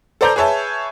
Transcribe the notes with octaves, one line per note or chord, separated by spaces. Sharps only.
A4 C5 D5 A#5 D6 G6
G#4 B4 C#5 E5 A5